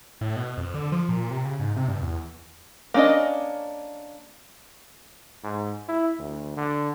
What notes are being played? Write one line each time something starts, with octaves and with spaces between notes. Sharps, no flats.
A2
B2
F2
D3
F3
A#2
C3
C#3
G#2
C3
G2
E2
A#3 C#4 D4 D#5
G#2
E4
D2
D3